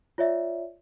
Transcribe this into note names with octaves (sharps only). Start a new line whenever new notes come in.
F4 C#5 D5 E5